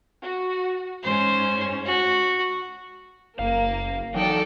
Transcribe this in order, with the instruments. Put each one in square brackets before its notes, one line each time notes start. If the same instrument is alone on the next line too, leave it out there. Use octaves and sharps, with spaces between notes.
[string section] F#4
[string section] G#2 C#4 [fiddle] C5
[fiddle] F#4
[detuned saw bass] F#1 [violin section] A#3 [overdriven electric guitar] F5
[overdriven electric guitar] E3 D#4 [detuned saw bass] F#3 [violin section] A4 D5 G5